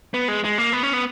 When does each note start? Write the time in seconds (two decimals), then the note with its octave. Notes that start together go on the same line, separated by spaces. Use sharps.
0.14 B3
0.28 G#3
0.44 G#3
0.58 A#3
0.73 B3
0.83 C#4
0.93 B3